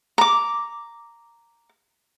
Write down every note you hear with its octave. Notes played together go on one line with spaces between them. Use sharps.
A#5 D6